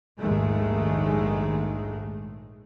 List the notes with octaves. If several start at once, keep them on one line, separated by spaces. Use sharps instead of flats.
A#1 D#2 G#2 D#3 G#3 A3